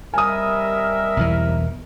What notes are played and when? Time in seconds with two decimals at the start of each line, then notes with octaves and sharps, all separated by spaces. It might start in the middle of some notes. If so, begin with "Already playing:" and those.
0.14 C3 G3 G4 A#4 D#5 E5 G#5 D#6
1.17 B1 E2 E3